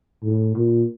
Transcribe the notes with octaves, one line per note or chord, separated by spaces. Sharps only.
A2
A#2